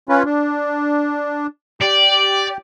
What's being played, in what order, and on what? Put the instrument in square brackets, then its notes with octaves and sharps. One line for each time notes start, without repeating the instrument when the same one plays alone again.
[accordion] C#4 F4 B4
D4
[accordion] G4 [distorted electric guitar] D5